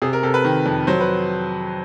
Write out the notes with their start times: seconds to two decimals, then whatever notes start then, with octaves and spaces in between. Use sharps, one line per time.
0.02 C3 G#4
0.13 A#4
0.23 C3 A4
0.34 B4
0.45 D#3
0.66 F2
0.87 F#3 C5
1.00 B4